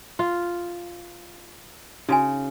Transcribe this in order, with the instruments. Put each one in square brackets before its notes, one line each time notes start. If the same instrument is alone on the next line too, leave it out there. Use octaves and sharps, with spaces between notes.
[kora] F4
[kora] C#3 [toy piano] D#4 F#4 G#5